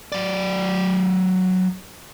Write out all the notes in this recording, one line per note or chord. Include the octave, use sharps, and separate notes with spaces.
F#3 D5